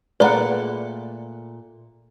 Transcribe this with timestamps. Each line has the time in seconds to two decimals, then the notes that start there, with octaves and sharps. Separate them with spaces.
0.20 A#2 A3 F4 G#4 B4 D5 F#5 A#5